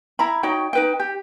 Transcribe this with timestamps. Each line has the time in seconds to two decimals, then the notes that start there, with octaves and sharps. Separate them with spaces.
0.19 E4 A#5 B5
0.43 D#4 F#4 C#5 G5
0.73 D#4 B4 G5
0.99 G4